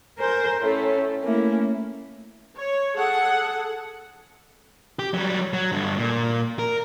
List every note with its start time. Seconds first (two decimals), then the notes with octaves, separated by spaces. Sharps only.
0.18 A#4 C5 G#5 G6
0.60 A2 A3 C#4
1.21 A3 A#3 C#4 E4
2.57 C#5
2.96 G#4 A4 F#5
4.99 G4
5.14 F#3 G3
5.53 F#3
5.72 G2 D3
5.97 A#2
6.59 A#4